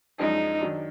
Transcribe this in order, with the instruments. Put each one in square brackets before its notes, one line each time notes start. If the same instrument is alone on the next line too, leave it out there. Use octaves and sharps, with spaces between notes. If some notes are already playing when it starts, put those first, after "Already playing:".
[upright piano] F#2 F3 G#3 D4 G#4 [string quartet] D#4
[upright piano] D#3 F#3 D4